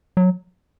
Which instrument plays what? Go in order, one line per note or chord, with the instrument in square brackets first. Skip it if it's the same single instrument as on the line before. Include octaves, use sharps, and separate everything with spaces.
[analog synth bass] F#3